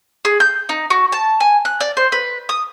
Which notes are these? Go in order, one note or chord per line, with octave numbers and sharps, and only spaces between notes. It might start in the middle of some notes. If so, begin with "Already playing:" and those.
G#4
G6
D#4
F#4
A5
G#5
F#6
D5
C5
B4
D#6